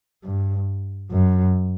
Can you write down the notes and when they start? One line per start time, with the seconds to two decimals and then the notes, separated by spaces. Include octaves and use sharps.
0.23 G2
1.11 F#2